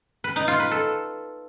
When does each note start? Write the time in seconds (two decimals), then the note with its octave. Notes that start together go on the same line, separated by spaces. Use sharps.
0.24 B4
0.36 D#4
0.48 F4
0.60 B4
0.71 A4